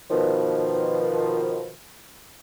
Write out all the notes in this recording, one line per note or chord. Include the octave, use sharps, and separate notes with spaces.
B2 D#3 F3